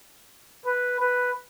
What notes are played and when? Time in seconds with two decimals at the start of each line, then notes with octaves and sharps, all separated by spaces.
0.65 B4
1.00 B4